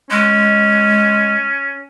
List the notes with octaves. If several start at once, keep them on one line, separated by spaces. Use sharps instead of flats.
G#3 C#4